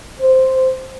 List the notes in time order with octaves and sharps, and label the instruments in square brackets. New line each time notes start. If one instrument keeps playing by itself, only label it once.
[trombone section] C5